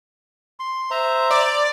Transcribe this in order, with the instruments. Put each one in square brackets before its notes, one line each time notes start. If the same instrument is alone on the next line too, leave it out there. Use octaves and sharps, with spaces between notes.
[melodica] C6
C5 E5 A#5
[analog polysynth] D5